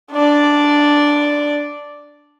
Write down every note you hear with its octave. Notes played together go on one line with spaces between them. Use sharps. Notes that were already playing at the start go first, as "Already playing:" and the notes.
D4 D5